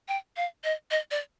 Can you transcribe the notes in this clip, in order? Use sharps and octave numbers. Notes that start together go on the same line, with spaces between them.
G5
F5
D#5
D#5
D5